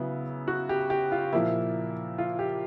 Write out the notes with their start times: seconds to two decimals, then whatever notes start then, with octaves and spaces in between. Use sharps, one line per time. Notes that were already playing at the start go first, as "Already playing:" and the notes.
Already playing: C#3 F#3 B3 E4
0.48 F#4
0.69 G4
0.90 G4
1.12 F4
1.33 A#2 F3 A#3 E4
2.18 F4
2.39 G4